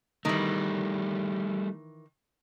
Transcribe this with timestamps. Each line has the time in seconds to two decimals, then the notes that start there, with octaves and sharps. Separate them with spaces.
0.25 D#3 E3 G3 A3